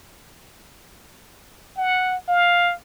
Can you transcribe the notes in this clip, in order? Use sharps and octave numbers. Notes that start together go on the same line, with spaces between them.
F#5
F5